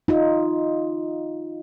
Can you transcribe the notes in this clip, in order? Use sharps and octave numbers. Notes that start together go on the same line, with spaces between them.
D#4 F4